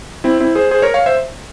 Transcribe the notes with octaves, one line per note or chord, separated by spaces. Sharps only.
C4 E4
C4 E4
G#4 C5
G#4 C5
A#4 C#5
C#5 F5
C5 E5